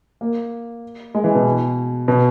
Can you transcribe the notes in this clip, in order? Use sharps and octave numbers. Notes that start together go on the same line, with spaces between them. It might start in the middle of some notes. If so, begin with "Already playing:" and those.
A#3
G#3
E3
B2
B2